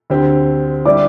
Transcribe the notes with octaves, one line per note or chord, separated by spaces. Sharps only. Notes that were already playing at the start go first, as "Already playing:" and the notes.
D2 D3 C4 G4
D3 G3 E4 G4 D5 D6